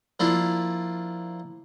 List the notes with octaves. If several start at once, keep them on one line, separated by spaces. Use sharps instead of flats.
F3 A#3 D4 E4